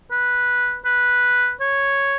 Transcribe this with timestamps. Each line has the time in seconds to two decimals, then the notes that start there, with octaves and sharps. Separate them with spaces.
0.11 B4
0.85 B4
1.61 C#5